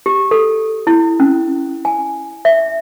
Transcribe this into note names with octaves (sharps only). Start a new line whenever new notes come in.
G4
A4
E4
C#4
G#5
E5